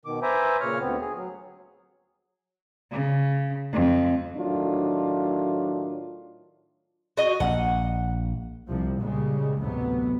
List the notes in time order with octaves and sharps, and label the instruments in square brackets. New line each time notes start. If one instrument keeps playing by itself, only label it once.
[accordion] B2 D#3 D6
B4 C5 E5 G#5 A#5 D6
A#2 C#3 C#5 F6
D2 B3 C4
G#4
F#3
[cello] C#3
F2
[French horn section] A2 D#3 F#3 D4 F4
[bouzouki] F#4 D#5
[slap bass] A#1 [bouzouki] F#5
[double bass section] C2 C3 F3
A#2 C#3 G3 G#3
A1 D2 C3 F#3 B3